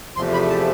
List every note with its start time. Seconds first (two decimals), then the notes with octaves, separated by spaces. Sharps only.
0.16 E2 C3 F3 A3 C6
0.33 B5
0.50 A5